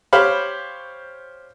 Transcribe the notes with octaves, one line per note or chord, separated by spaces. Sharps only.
G4 C5 C#5 F5 B5